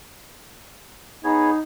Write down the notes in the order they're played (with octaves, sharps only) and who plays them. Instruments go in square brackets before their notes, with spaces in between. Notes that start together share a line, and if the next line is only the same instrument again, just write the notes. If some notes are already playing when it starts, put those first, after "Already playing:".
[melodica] B3 G#4 C#5 [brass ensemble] D#4